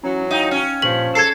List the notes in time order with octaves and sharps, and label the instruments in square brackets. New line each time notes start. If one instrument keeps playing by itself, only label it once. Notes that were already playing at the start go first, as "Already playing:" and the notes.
[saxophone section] G#2 E3 F#3 [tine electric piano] C#4 A#5
[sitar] D#4 [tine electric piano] F5 G5
[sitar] C#4
[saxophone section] G2 F3 [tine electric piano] A#2 C#6 B6 [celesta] F#7
[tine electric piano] G#4 [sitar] A4 [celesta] G#6 C7